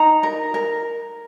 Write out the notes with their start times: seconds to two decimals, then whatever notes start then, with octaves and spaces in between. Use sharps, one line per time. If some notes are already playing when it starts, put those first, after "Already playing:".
Already playing: D#4 A#5
0.23 A#4
0.54 A#4